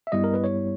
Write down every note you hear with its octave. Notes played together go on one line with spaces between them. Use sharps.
E5
G2 G3 B3 E4 D#5
A#4
B4
C#5